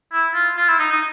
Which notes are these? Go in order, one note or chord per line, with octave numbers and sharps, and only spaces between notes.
E4
F4
F4
E4
D#4
D#4